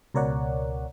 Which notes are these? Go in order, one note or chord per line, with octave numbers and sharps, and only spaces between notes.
C#2 B2 A#4 C#5 D5 F#5